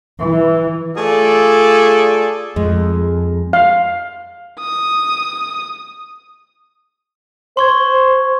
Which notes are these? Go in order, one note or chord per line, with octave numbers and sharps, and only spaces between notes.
E3
A3 F4 G#4 A4 D5
F2 G#3
F5
D#6
C5 C6 C#6 G#6